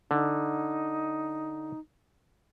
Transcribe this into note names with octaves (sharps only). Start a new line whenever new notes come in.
D3 D#4